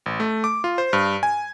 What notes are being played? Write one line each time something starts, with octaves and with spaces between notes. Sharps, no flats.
A1
A3
D6
F4
C5
G2
G#5